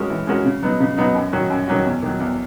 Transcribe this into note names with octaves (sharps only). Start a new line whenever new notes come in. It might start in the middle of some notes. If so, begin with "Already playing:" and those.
Already playing: G#3 C#4 F#4 A#4
E3
G#3 C#4 F#4 A#4
C#3
F#3 B3 D#4
C#3
F#3 B3 D#4
F#2
D#3 F#3 C#4 F#4
F#2
D#3 F#3 C#4 F#4
E2
D#3 F#3
E2